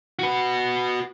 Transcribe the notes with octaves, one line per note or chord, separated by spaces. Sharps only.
F#4 B4